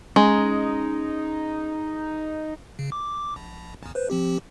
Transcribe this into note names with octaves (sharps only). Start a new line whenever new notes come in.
G#3 C#4 D#4
C#3
D6
A#1
A1 E2
B4 C5
F3 C4 G4